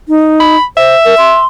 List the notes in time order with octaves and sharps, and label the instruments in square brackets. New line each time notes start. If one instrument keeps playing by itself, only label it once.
[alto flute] D#4
[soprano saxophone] B5
[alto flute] C5 [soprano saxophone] E5
[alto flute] A#4
C6